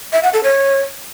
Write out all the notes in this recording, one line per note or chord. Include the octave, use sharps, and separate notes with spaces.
E5
F#5
A4
C#5